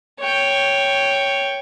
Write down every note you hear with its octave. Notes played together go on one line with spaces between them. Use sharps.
C#5 G5